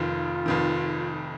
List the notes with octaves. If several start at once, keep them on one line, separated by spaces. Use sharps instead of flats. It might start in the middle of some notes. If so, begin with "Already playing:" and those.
Already playing: F1 F2 D#3 F4
F1 F2 D#3